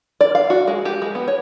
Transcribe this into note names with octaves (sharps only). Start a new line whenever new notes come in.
D5
F5
F#4
G#3
G4
G#3
B3
C#5